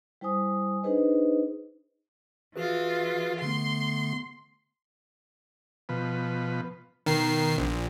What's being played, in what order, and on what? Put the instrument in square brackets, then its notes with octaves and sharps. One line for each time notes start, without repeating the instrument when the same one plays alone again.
[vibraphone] G3 E4 C5 G#5 D#6
D4 D#4 G#4 B4 C5 D#5
[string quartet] E3 F4 [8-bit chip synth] F#4 G#4 B4
[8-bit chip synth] D3 A3 B3 [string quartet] C6
[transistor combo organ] B2 F3 B4
[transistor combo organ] B2 [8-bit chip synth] D#3 C7
[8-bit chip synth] A#1